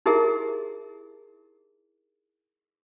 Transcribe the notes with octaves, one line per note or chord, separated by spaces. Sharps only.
D#4 E4 G4 G#4 A#4 E5